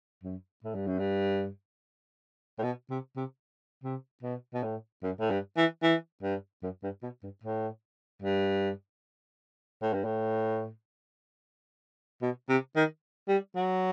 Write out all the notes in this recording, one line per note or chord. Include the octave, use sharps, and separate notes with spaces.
F#2
A2
G2
F#2
G2
A2
B2
C3
C3
C3
B2
B2
A2
F#2
A2
G2
E3
E3
G2
F#2
G2
B2
G2
A2
G2
A2
G2
A2
B2
C3
D#3
G3
F#3